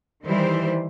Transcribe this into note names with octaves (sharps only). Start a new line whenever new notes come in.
D#3 E3 G3 E4 C5